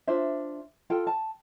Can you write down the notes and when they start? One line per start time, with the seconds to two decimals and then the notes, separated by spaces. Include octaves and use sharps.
0.07 D4 F4 C5 E5
0.90 F4 A4 G5
1.07 A5